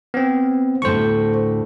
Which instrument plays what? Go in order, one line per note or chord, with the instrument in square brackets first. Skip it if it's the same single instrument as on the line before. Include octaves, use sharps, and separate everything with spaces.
[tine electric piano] B3 C4
[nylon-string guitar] D2 A2 [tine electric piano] C5 C#6